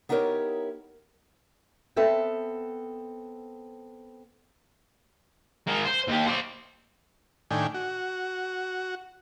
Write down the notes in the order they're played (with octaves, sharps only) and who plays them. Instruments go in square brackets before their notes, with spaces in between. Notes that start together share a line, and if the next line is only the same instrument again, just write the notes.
[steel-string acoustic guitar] B3 D#4 E4 G4 A#4 C#5
[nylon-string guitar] B3 C4 A4 E5 G5
[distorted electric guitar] G#3 A#4
C5
D#2 G4
C5 D5
[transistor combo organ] A2 D#3 D4 G5 G#5
F#4